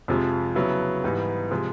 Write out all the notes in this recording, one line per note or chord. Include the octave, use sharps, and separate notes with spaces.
F2 C3 F3 G#3
C#3 F#3 B3 E4
G#2 E3 G3 B3 D#4
C3 F3 G#3